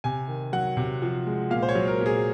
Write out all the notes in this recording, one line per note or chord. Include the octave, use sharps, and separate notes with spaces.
C3 G#5
D#3
F#3 F#5
C3
F3
G#3
A#2 F5
C5
C#5
F#3
A#4
A#2
G#4